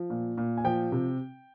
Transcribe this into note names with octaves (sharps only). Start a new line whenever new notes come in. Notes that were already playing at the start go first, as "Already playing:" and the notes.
Already playing: F3
A#2
A#2
G#5
F3 G5
C3